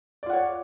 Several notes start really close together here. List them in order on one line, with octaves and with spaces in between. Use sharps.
D5 F4 F#5 C#5